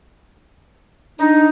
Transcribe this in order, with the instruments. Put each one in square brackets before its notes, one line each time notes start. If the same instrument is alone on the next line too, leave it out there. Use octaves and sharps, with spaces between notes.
[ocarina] D4 [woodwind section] D#4